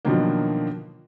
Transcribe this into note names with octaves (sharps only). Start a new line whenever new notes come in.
B2 D3 D#3 F3 F#3 A#3